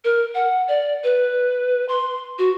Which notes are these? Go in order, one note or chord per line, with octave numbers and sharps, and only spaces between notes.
A#4
F#5
D5
B4
C6
F#4